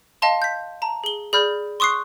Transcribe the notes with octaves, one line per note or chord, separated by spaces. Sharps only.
D#5 F5 A5 C6
G6 B6
A5 A#5
G#4 G7
G#4 D5 B5 F6 G6
C6 C#6 D#6 F#6 C7